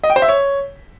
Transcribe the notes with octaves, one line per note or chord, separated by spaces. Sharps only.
D#5
G5
C5
E5
C#5